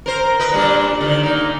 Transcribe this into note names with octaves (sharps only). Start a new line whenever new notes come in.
A#4 C5
B4 D#5
A#2 G3 D4
D3 D#3
A#2 D#4